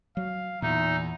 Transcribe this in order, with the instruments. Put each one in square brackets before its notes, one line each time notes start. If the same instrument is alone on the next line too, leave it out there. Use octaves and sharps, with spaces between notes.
[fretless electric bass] F#3 [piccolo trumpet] F5
[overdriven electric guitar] E2 [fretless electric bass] A#2 [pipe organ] D#4 [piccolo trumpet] E5